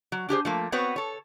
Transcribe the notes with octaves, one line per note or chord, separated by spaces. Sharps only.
F#3
D4 G4 G#4 C5
F3 A3 A#3
B3 C4 F#4 B4 C#5
A4 C#5